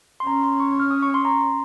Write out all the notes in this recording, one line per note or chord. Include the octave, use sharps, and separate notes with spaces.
C6
C#4 A#5
C6
C#6
F6
D#6
C#6
C6
A#5
C6